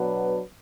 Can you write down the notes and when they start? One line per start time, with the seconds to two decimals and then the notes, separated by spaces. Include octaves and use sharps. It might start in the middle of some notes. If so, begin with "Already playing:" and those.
Already playing: B2 F#3 B3 D4 B4